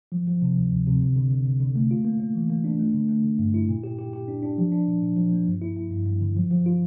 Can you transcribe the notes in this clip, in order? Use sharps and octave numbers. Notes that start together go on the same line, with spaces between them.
F3
F3
C3
D2
D2
C3
D3
D3
D3
D3
D3
A3
F4
A#3
A#3
E3
A#3
D4
A3
D3
A3
D3
G2
E4
A#2
G4
G4
G4
D4
D4
F3
D4
A#2
A#2
F3
A#3
G2
E4
E4
G2
G2
D3
F3
F3
F4